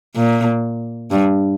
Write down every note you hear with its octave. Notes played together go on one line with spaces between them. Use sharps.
A#2
G2